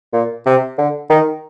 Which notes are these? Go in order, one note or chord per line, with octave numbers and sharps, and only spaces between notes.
A#2
C3
D3
D#3